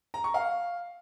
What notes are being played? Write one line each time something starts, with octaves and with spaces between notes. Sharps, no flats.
A#5
C#6
F5